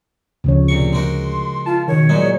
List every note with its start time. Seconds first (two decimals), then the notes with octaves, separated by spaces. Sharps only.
0.44 D2 C#3 F3 C#5
0.68 A#1 C3 C#6
0.93 G#3 F#4 A#4 C6
1.66 F4 A5
1.88 B2 D#3 C#5
2.09 A#2 F#3 G#3 D#4